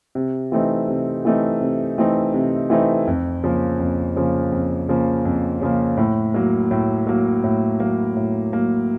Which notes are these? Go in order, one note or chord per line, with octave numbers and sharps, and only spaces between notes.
C3
E3 A3 C4 D#4
C3
E3 A3 C4 D#4
C3
E3 A3 C4 D#4
C3
E3 A3 C4 D#4
F2
C#3 F3 A#3
F2
C#3 F3 A#3
F2
C#3 F3 A#3
F2
C#3 F3 A#3
A2
F#3 A#3
A2
F#3 A#3
A2
F#3 A#3
A2
F#3 A#3